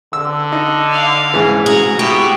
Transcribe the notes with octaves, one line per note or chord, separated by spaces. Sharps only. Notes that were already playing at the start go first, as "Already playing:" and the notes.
D3 E6
D#4
F5
G#2 C#3 E3
F#4 G#4 A#5
B2 E4 G4